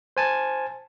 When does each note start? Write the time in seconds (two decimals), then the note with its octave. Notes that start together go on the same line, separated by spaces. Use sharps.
0.17 C5 G#5 A5